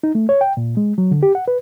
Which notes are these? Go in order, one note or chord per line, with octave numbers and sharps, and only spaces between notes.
D#4
A3
C#5
G5
A#2
G#3
F#3
D3
G4
F#5
B4